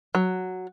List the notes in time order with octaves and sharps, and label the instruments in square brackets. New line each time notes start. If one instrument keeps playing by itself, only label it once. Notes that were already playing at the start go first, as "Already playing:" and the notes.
[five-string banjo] F#3